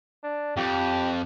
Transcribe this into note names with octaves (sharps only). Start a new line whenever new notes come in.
D4
F2 G4